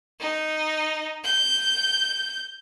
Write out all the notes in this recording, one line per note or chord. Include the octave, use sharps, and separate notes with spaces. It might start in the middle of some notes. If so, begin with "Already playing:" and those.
D#4
G6